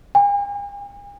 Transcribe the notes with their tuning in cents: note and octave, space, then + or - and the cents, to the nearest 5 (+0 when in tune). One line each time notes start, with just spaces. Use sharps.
G#5 -45